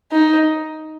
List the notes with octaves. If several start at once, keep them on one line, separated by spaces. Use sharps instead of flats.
D#4